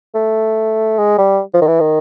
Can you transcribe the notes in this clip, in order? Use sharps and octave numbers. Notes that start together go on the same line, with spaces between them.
A3
G#3
G3
F3
D#3
E3
D#3